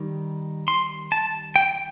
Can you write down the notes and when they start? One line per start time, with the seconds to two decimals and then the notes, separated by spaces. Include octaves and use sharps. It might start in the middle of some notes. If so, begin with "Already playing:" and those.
Already playing: D#3 G3
0.68 C6
1.12 A5
1.56 G5